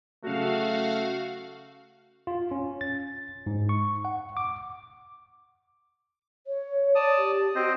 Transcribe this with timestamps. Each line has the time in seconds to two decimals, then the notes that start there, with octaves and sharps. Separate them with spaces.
0.23 C#3 F#3 A3 F#4 F5
2.27 F4
2.51 C#4
2.81 A6
3.46 G#2
3.69 C#6
4.05 F#5
4.37 D6
6.47 C#5
6.95 D5 A5 D#6
7.17 G4
7.55 C4 F#4 C5 D#5